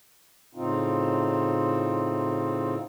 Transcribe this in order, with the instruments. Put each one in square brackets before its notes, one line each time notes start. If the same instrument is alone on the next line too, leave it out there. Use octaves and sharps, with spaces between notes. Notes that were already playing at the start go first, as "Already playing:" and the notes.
[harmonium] A2 C#3 C4 D#4 F4